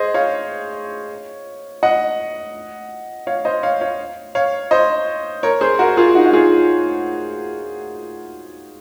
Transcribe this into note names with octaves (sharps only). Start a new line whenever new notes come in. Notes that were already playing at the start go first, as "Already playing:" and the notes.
Already playing: G#4 C5 D#5
C#5 F5
D#5 F#5
C#5 F5
C5 D#5
C#5 F5
C#5 F5
C#5 F5
C5 D#5
A#4 C#5
G#4 C5
F#4 A#4
F4 G#4
D#4 F#4
F#4
F4 G#4